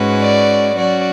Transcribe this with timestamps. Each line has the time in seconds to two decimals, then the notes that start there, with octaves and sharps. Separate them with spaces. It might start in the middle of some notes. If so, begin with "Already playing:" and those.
Already playing: G#2 G#3 C#4 F#4 B4
0.20 D5
0.77 F#3 C#4 F#4 D5